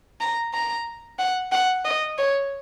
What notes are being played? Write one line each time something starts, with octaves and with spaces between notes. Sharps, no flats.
A#5
A#5
F#5
F#5
D#5
C#5